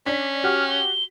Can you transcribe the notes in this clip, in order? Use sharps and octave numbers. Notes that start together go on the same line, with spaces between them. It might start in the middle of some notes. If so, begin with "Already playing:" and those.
C#4 D4 B6
F#4 G4 F6
G7